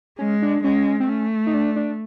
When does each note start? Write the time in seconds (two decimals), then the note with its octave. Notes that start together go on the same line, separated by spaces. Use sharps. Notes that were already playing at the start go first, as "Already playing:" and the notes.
0.19 G#3 C#4
0.42 D4
0.64 G#3 C#4
1.00 C4
1.09 A3 C#4
1.47 D#4
1.54 D4
1.76 D4